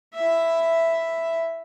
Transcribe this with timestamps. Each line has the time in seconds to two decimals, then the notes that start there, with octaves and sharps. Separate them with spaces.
0.14 E4 E5